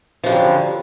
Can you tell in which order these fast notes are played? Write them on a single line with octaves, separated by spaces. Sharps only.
F3 F#2 G3 D3